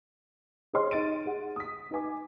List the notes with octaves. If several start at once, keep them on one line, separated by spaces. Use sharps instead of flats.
G#4 C5 C#5 D#5 C6 F6
D#4 D#5 A6 D7 D#7
G#4 F#5
D#6 B6
D#4 B4 G#5 D6